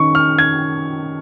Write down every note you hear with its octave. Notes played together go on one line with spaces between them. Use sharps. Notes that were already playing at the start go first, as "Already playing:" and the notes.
Already playing: D#3 C#4 C#6
F6
G#6